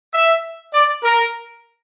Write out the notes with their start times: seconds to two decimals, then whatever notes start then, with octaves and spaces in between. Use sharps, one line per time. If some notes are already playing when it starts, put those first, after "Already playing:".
0.14 E5
0.74 D5
1.04 A#4